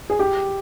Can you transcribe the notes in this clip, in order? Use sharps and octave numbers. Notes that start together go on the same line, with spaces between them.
G#4
G4